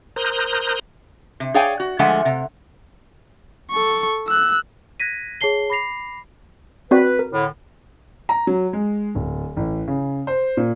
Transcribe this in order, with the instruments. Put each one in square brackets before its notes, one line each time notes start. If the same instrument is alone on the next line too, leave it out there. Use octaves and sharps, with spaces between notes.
[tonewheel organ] A#4 C5 A#5 D#6 F#6 G6
[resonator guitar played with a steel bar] C3
G#4 C#5 D5 F5 G5 G#5
F#4
D3 F3 G#3 A3 F#5 G#5
C3
[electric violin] A4 C#6
E6 F#6
[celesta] F#6 G#6 A#6 B6 D#7
G#4 C#5 A5 C7 G7
B5 D6 A#6 C7 F7
[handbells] C4 F#4 D5 [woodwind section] B4
[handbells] A#4
[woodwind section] A2 D3
[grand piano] A#5
F#3
G#3
D1
A1
C#3
C5
A#2